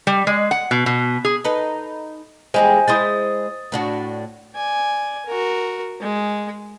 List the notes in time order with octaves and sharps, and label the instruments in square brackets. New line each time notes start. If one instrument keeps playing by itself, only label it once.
[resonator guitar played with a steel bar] G3
G#3
F#5
B2
B2
G#4
[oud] D#4 A4 B4
[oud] E2 G3 G#3 [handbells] C5 D#5 G#5
[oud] G#3 E4 C5 [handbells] D#6 A6
[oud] A2 D4 F#4
[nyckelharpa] D5 G#5
F#4 A#4
G#3